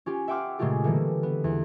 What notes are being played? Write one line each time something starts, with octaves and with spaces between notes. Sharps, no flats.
C#4 F4 G4
E5 F#5 G5 C6 D6 F6
A#2 C#3 G#3 A3 F4 G4
D3 E3 G3 A#3
B3
E2